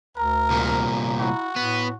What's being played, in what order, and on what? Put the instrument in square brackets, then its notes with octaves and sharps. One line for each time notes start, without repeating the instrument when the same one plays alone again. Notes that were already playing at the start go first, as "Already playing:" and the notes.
[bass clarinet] D2 [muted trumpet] A#4 [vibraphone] A#5
[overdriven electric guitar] C2 A#2
[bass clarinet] E4 [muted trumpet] F#4
[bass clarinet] A2 [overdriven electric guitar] B3